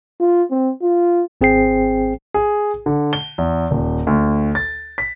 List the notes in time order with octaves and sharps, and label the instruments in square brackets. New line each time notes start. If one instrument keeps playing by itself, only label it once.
[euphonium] F4
C4
F4
[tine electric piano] G#1 C4 G#4 C5 G5 C7
[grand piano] G#4
D3
G7
E2
D#1
D2
A6
B6